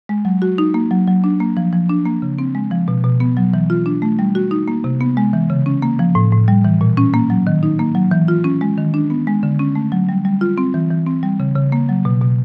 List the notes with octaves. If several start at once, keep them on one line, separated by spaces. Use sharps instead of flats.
G#3
F#3
F#4
D#4
A#3
F#3
F#3
D4
A#3
F3
F3
D4
A#3
C#3
C4
G#3
F3
B2
B2
B3
F#3
E3
F4
D4
A3
G3
F#4
D#4
A#3
C3
B3
G#3
E3
C#3
C#4
A#3
F3
A2
A2
G3
E3
A#2
C#4
A#3
F#3
D#3
D#4
A#3
F#3
E3
F4
C#4
G#3
D#3
D4
B3
G#3
D3
C#4
A3
F#3
G3
G3
F4
C4
E3
E3
C4
G3
C#3
C#3
A#3
F#3
B2
B2